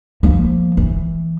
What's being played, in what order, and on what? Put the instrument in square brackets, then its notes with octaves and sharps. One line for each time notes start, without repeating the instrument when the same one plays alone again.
[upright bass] F3 A#3
E3